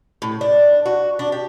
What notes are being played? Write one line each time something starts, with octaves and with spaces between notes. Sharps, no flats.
A2
D4
F#4
D4
G4